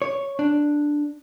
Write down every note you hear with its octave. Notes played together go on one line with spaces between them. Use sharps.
C#5
D4